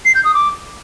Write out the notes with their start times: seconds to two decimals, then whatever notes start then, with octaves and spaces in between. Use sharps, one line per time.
0.05 C7
0.15 G6
0.25 D#6
0.34 D6